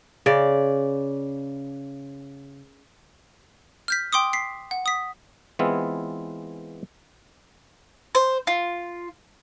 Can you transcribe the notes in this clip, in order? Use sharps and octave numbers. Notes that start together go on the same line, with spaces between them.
C#3 D5
F6 G6 B6
G5 C6 D6 D#6
B6 C7
F#5
D#6 B6
E3 G#3 B3 C4 E4 F4
C5
F4